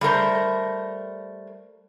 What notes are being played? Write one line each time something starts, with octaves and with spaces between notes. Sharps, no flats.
G3 A3 A#4 C5